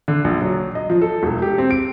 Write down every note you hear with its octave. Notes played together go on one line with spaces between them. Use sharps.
D3
A#1
F#3
D#5
F3
A4
E1
G4
C4
D7